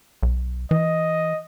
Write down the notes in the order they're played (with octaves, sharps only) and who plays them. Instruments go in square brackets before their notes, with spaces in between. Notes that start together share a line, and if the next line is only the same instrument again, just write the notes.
[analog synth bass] B1
[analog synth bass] E3 [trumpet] D#5